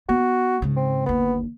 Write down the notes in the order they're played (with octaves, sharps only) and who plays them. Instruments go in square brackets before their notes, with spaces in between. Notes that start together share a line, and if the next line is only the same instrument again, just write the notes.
[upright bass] B3 [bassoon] F#4
[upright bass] G#2 C#3
[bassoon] C4
[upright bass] G1 D#2 [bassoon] B3